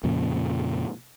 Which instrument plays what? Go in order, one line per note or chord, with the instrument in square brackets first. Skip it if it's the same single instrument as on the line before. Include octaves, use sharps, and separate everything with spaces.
[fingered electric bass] F2 A#2 C#3